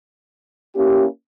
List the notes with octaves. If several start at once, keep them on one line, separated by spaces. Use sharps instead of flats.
A#3 C#4 E4 G4